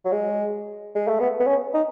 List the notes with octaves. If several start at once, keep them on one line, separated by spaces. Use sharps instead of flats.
F#3
G#3
G#3
A3
B3
B3
C#4
D#4